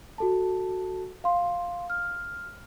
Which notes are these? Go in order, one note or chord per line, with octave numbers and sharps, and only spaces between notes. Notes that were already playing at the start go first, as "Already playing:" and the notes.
F#4 A4 A5
F5 C6
F6